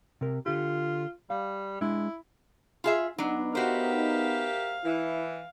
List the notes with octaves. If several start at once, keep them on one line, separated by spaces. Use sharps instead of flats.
C3 A#4
D3 F4 G4
G3 F5
G#3 D4 E4
F4 G#4 E5
F#3 B3 D4 D#4
F#4 G4 A#4 C5 E5 F5
E3 E4